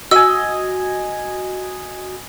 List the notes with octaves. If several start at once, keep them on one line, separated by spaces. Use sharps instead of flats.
F#4 D#5 G#5 E6